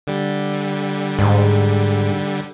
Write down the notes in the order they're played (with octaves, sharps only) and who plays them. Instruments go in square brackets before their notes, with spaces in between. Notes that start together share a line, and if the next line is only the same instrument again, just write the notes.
[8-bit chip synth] D3 G3
[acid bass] G#2